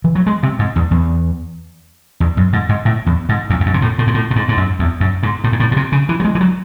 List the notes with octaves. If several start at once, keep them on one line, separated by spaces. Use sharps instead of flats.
E3
F#3
G#3
C3
G#2
E2
E2
E2
F#2
G#2
G#2
A2
E2
G#2
E2
E2
F#2
C3
A2
A2
G#2
A2
A2
G#2
G#2
F#2
E2
F#2
G#2
A2
G#2
A2
A2
C3
C#3
E3
F#3
G#3
E3
F#3